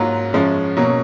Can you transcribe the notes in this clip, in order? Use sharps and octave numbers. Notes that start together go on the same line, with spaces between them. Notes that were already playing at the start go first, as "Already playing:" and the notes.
Already playing: G#2 F#3 A#3 F4 F#4
F#2 F3 G#3 C#4
B2 F#3 A#3 C#4